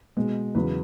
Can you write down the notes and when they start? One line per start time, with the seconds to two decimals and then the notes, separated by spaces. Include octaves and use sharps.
0.17 B2 G#3 B3
0.55 E2 C#3 F#3 B4